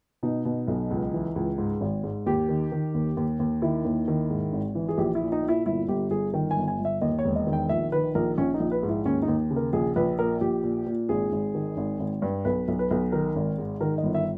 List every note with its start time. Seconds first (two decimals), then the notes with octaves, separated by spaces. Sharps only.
0.23 B2 D#4
0.45 B2
0.68 B1
0.91 C#2
1.14 E3
1.36 C#2
1.58 G#2
1.81 G#1
2.04 G#2
2.26 D#2 G4
2.49 D#3
2.72 D#3
2.94 D#2
3.17 D#2
3.40 D#2
3.62 D#3 E4
3.85 D#2
4.08 D#3
4.30 G#2
4.53 G#1
4.75 E3
4.89 G#4
4.98 A#1 G4
5.15 E4
5.20 A#2
5.32 D#4
5.43 A#2
5.48 E4
5.66 G1 E4
5.88 G1 G4
6.11 G1 G#4
6.34 D#3 G5
6.51 G#5
6.56 G1
6.68 G#5
6.79 G1
6.85 E5
7.01 D#2 D#5
7.19 C#5
7.25 E1
7.36 D#5
7.47 D#3
7.53 G5
7.69 A#1 E5
7.92 D#3 B4
8.15 A#1 A#4
8.38 A#1 C#4
8.54 D#4
8.60 A#1
8.71 B4
8.83 G#2
8.88 E4
9.05 D#2 C#4
9.22 D#4
9.28 D#2
9.51 C#3
9.56 A#4
9.73 A#1 G#4
9.96 A#1 B4
10.18 A#2 A#4
10.41 A#1 G4
10.64 A#2
10.86 A#2
11.09 G#1 G#4
11.32 G#1
11.55 D#3
11.77 G#1
11.99 G#1
12.22 G2
12.45 B1 B4
12.68 B1
12.79 B4
12.91 B1
13.12 D#3 A#4
13.36 G#1
13.58 G#2
13.81 D#3 A#4
13.98 D#5
14.03 G1
14.15 E5